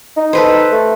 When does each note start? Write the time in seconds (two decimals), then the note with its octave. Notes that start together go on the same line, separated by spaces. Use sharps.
0.17 D#4
0.33 A4 B4 C5
0.72 A3